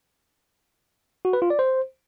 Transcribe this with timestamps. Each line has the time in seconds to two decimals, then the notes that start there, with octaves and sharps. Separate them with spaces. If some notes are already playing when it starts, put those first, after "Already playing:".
1.25 F#4
1.33 B4
1.42 F4
1.50 D5
1.59 C5